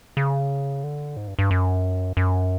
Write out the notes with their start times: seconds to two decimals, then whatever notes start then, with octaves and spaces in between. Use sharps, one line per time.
0.17 C#3
0.84 D3
1.17 G#2
1.28 G2
1.39 G2
1.51 F#2
2.17 F#2